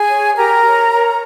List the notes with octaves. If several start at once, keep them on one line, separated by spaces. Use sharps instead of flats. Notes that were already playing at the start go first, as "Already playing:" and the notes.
Already playing: G#4 G#5
C#5
G4 A#4 A#5
C#5
C#5